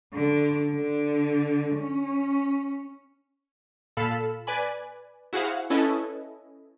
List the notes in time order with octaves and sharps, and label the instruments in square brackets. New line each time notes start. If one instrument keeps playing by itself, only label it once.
[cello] D3
D3
C#4
[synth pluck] A#2 A4 F5 B5 E6 E7
B4 D5 G#5 B5
E4 F#4 G#4 C5 F5 F#5
C#4 E4 A4 B4 D#5